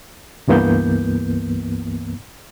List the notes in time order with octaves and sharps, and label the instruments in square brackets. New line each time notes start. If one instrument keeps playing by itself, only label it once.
[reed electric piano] C#2 G2 E3 A#3 B3 G6